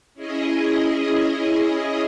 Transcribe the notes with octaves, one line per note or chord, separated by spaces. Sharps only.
C#4 E4 G#4 D#5